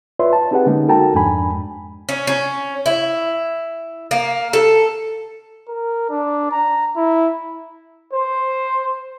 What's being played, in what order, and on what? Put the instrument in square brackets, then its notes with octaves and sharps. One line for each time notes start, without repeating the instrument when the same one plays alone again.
[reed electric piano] F4 B4 C#5 D5 E5 C6
A5
C4 D#4 G4 G#4 B4 F#5
D3 G#3 A#3 C#4 D#4
F#4 A4 A#4 G5 A5 A#5
F2 G#2 G#3 D4 G#5 B5
[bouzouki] C#4
C#4
E4
A#3
A4
[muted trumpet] A#4
D4
A#5
E4
[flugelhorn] C5